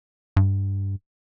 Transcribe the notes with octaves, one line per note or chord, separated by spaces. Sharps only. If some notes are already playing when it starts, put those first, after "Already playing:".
G2